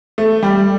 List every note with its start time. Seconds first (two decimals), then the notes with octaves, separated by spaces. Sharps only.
0.18 A3
0.43 G3